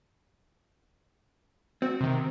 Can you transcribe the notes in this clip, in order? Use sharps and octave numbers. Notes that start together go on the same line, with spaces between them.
C4 F#4
C3 D#3